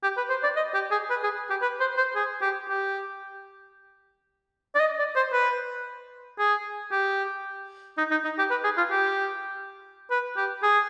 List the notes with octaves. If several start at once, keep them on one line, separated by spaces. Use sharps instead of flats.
G4
B4
C5
D5
D#5
G4
G#4
B4
G#4
G4
B4
C5
C5
G#4
G4
G4
D5
D#5
D5
C5
B4
G#4
G4
D#4
D#4
D#4
G4
B4
G#4
F4
G4
B4
G4
G#4